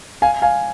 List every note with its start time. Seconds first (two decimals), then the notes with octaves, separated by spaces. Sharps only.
0.22 F5 G#5
0.42 F5 G#5